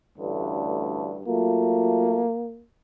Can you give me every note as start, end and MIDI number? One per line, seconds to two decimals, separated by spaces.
0.19 1.22 33
0.19 1.22 38
0.19 1.22 43
1.27 2.27 54
1.27 2.27 57
1.27 2.64 58
1.27 2.27 65